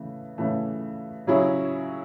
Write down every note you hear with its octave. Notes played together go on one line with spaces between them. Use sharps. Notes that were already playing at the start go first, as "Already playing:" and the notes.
Already playing: C#3 E3 A3
C#3 E3 A3
C#3 F#3 C#4 E4 G#4